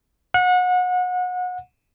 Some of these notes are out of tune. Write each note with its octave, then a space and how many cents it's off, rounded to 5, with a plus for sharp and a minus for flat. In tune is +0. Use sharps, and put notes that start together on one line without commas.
F#5 -30